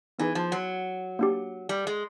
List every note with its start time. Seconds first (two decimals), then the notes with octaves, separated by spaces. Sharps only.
0.19 E3 B3 D#4 G#4 B4
0.35 F3
0.52 F#3
1.19 A#3 D4 G4
1.69 G3
1.87 G#3